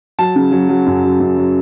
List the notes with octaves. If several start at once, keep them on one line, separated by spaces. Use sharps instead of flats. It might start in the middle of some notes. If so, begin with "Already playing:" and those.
F#3 A5
C#3
F#3
F#3
F#2
F#3
F#2
F#3